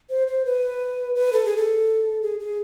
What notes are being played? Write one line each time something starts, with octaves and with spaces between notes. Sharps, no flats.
C5
C5
B4
B4
A4
G#4
A4
G#4
G#4